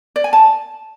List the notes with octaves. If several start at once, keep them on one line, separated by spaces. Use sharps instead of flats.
D5
G#5
A5